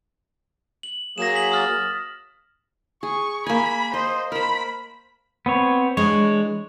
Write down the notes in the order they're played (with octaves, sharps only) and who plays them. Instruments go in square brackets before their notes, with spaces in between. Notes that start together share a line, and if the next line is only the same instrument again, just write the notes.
[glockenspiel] F#7
[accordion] F#3 A#3 G#4 [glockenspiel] A#6 E7
[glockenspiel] B6 F#7
D#6 F6 A6
[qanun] G#4 [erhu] C#6
[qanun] A#3 G#5 [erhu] B5
[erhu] C5 [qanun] D#5
[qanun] A#4 C5 [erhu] B5
[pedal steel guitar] B3 C4 C#5
[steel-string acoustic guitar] E3 G#3 D4 [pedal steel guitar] C#5